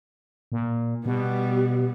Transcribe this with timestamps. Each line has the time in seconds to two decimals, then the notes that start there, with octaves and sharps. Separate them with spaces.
0.52 A#2
1.06 B2 G3 B3